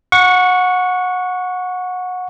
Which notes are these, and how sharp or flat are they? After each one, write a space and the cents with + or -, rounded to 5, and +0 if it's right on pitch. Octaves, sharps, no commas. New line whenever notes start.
F#5 -25 C#6 +5